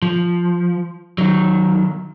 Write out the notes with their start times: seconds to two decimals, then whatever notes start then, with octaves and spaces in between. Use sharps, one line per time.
0.02 F3
1.18 D#3 F#3